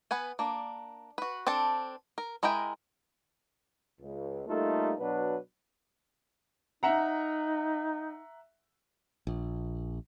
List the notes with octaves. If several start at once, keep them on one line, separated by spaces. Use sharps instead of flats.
B3 B4 F#5 G#5
A#3 D4
F#4 B4
C4 D4 A4 A5
A#4
G#3 E4 A#4 D#5 G5
C#2
G3 A3 A#3 D#4 F4 A4
B2 F#3 D4 F#4 B4
D#4 E5 F#5 A#5
A#1